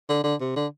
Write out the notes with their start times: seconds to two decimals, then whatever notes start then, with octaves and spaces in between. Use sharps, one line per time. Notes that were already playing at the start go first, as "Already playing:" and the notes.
0.09 D3
0.24 D3
0.40 C3
0.56 D3